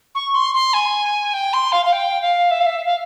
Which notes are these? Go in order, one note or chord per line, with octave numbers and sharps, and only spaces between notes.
C#6
C6
C6
G#5
G5
C6
F5
F5
G5
F5
E5
F5
E5
F5